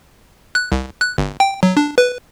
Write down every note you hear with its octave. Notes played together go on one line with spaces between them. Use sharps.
F#6
C2
F#6
G1
G5
F#3
D4
B4